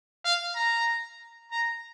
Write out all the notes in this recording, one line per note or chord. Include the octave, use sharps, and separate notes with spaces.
F5
A#5
A#5